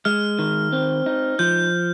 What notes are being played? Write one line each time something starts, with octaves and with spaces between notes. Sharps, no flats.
G#3 F6
D#3
C4
D#4
F3 G6